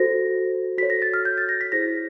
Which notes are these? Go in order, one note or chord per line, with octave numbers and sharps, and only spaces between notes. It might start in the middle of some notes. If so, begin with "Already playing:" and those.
Already playing: F#4 A4 C5 A#6
F#4 A4 C#5 B6
A#6
A6
F6
G6
A6
A#6
B6
E4 G#4 C5 A#6